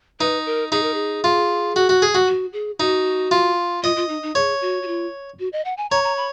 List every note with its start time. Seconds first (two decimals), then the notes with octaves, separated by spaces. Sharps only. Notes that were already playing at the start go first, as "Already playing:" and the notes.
0.20 D#4 B4
0.46 A#4
0.71 D#4 G#4
0.83 A#4
0.94 G#4
1.24 F4
1.76 F#4
1.89 F#4
2.02 G#4
2.15 F#4
2.28 F#4
2.53 G#4
2.79 D#4 F#4
3.31 F4
3.83 F4 D#5
3.96 F4
4.09 D#4
4.23 D#4
4.35 G#4 C#5
4.61 F#4
4.83 F#4
4.87 F4
5.40 F#4
5.53 D#5
5.65 F#5
5.77 G#5
5.90 C#5 A#5
6.04 A#5
6.17 B5